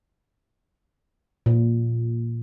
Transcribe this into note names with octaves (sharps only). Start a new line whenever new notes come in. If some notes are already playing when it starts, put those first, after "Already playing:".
A#2